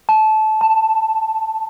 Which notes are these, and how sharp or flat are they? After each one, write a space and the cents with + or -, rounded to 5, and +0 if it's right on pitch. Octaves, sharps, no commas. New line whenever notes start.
A5 -20
A5 +10